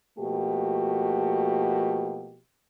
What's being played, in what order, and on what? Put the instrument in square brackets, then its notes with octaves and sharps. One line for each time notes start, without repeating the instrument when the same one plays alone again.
[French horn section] B2 F3 A3 A#3 F#4 G4